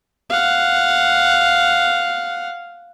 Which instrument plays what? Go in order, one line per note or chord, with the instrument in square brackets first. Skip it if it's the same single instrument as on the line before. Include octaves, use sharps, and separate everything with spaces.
[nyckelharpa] F5 F#5